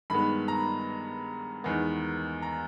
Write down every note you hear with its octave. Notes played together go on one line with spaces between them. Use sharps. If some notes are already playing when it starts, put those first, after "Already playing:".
G2 D#3 G#3 B3 B5
A#5
E2 D#3 G#3 B3
A#5